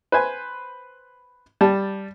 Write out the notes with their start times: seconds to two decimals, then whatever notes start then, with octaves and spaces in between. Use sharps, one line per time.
0.12 B4 C5 G#5
1.61 G3 A5